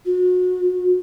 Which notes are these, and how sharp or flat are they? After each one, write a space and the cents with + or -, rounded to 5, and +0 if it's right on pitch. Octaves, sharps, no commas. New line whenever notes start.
F#4 -30